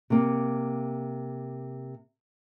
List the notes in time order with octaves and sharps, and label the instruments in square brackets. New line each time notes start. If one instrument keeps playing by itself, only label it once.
[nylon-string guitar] C3 A#3